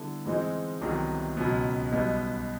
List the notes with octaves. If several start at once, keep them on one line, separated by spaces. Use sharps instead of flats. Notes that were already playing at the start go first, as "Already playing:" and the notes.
Already playing: D3 G3 B3 E4 A4
G#2 E3 G#3 C4 D#4
C2 C3 D#3 F#3 B3
C#2 B2 F#3 B3
B1 B2 G3 B3 D#4